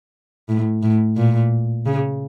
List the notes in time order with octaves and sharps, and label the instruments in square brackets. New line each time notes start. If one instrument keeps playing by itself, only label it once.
[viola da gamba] A2
A2
A#2
C#3